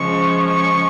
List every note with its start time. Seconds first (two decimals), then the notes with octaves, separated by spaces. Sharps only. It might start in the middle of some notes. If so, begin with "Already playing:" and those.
Already playing: C#3 F3 G#3 C#6
0.47 C#6